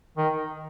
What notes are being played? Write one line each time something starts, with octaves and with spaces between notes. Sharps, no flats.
D#3